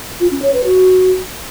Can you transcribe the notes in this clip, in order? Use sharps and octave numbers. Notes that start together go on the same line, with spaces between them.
F4
C#4
C#5
B4
F#4